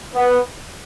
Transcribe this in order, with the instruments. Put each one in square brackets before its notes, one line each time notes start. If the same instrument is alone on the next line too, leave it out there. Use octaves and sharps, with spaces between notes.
[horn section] B3